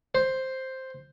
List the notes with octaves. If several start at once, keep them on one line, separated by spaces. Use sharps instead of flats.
C5